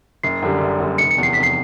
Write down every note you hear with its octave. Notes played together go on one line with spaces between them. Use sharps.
F#1 C7
F#2 D3 G3
F#1
F#2 D3 G3
F1 C#7
C#7
E2 C3
C7
F1 B6
C7